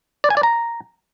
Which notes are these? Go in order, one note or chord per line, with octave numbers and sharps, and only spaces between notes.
D5
G#5
D5
A#5